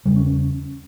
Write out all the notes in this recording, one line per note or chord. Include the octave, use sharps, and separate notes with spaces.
E2 C#3 G3
C#4
C#4